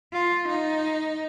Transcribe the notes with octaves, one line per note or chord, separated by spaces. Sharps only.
F4
D#4